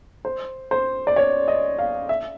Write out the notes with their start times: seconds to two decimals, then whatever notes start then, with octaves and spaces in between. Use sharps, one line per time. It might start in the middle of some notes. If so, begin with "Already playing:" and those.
0.25 C5
0.71 C5
1.07 D5
1.16 C#5
1.48 D#5
1.79 F5
2.09 E5